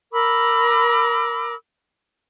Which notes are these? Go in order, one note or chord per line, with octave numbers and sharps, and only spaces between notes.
A#4 B5 D6 E6